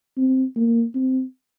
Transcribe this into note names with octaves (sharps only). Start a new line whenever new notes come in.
C4
A#3
C4